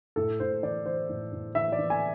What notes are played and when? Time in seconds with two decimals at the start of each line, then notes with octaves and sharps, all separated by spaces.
0.16 A2 A4
0.40 A2 C5
0.63 E3 D5
0.86 E3 C5
1.09 A2
1.33 A2
1.55 E3 E5
1.72 D5
1.79 E3
1.90 G#5